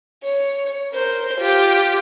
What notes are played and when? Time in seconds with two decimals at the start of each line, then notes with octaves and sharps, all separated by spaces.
0.23 C#5
0.92 A#4 C5
1.37 F4 G4